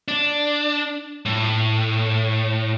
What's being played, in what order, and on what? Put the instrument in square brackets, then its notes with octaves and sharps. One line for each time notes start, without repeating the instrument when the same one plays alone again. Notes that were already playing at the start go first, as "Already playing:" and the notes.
[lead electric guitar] D4
A2